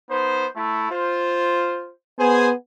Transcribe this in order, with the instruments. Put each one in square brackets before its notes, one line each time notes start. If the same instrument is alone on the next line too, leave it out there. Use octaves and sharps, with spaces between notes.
[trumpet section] B3 D#4 C5
A3 E4
F4 C5
[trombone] B3 [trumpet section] G#4 C5 G#5